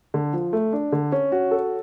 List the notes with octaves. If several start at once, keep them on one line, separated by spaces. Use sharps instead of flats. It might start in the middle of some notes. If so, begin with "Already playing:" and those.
D3
F3
A3
D4
D3
C#4
F#4
A4